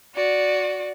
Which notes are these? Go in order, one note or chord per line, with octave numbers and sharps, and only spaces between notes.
F#4 D5